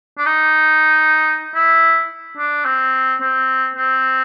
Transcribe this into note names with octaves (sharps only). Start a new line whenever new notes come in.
D4
D#4
E4
D4
C4
C4
C4